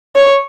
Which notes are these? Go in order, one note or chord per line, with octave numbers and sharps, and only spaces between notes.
C#5